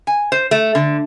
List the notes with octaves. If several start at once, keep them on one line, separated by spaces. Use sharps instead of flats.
G#5
C5
A3
D3